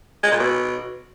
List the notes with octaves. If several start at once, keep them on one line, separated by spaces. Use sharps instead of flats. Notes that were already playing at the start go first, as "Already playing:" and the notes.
G#3
A#2
B2